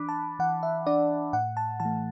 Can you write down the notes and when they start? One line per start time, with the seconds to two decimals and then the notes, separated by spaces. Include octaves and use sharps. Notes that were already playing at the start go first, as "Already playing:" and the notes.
Already playing: E3 D4 B5 D6 F#6
0.09 A5
0.39 E3 F#5
0.63 E5
0.87 D4 D5
1.33 A2 F#5
1.57 A5
1.80 E3 A5
1.85 A3